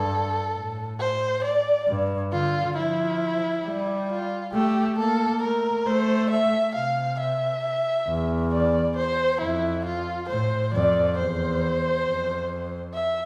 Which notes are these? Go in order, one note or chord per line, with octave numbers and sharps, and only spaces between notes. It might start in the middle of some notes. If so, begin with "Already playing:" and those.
Already playing: G2 A4
A2
C5
D5
G2
D3 F4
F3 E4
G3
F4
A3 G4
A#3 A4
A3 A#4
A3 C5
E5
C3 F5
E5
E2
D5
C5
F2 E4
F4
A2 C5
F2 D5
E2 C5
F2
E5